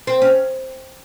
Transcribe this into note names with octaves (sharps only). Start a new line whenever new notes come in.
C4
C#4